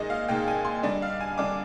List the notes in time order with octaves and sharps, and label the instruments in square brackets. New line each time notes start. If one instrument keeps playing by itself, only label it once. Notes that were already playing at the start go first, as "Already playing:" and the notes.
Already playing: [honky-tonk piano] A#2 G#3 D#4 D#5
F5
A#2 G#3 D#4 G5
G#5
C6
D3 G3 D4 D#5
F5
G#5
D3 G3 D4 D6